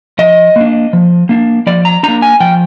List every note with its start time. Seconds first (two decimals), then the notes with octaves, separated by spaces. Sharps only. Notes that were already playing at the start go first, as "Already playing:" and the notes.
0.19 F3 D#5
0.56 A#3 D4
0.93 F3
1.29 A#3 D4
1.67 F3 D5
1.85 A#5
2.03 A#3 D4 A#5
2.22 G#5
2.40 F3 G5